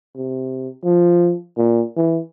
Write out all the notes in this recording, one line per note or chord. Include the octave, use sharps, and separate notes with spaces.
C3
F3
A#2
E3